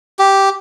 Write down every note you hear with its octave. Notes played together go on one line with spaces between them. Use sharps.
G4